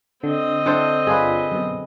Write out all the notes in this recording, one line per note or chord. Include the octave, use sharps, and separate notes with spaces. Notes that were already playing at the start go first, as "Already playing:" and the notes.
D3 C4 D#5
D3 E4 A4 C5 G5
G1 D4 F4 G#4 B4
F#2 B2